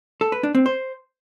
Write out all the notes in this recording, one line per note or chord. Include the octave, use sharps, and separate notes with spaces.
A4
B4
D4
C4
C5